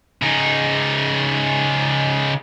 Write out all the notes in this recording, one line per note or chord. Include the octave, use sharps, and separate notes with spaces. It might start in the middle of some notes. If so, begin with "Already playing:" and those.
C#3 D#4